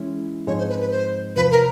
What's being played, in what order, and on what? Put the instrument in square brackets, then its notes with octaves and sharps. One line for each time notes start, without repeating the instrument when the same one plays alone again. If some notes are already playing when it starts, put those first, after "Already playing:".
Already playing: [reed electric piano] E3 G#3 C#4 E4
[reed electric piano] G#2 F3 G#3 C4 D#4 [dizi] C#5
[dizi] C5
B4
B4
C5
[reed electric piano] E2 C3 F3 [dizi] B4
[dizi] A#4